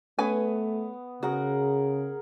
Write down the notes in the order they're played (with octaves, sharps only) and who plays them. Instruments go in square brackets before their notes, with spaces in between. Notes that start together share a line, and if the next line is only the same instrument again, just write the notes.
[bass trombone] A3 [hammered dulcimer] B3 [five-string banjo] C#4 B4 G#5
[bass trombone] C#3 [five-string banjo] F#4 [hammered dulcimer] G#4 A#4 F#5